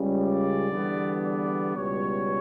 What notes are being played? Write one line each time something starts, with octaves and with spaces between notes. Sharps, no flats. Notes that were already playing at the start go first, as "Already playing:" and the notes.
Already playing: C#2 C#3 G3
D5
E2 D3 G3 B3
D5
C#2 B2 G3 C#5